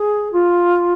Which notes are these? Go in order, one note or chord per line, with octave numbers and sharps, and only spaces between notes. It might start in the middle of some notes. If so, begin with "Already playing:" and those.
Already playing: G#4
F4